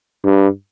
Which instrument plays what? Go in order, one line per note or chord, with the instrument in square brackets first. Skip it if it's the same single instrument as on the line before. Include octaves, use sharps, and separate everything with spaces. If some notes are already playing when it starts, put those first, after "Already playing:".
[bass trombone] G2